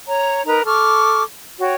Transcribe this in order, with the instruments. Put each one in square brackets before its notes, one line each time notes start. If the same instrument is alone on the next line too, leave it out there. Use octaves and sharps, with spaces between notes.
[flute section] C#5 A#5
D#4 A#4 B4 A#5
A4 C#6 D6 F6
F#4 C#5 G5